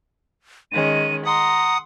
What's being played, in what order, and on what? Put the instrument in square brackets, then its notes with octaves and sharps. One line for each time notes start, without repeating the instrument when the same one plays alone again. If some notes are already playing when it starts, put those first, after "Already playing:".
[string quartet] D#3 G#3 C#4 [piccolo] D#7
[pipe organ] F#5 D#6 [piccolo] A#5 [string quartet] C6